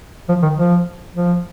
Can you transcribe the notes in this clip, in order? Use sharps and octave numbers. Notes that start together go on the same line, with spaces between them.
F3
D#3
F3
F3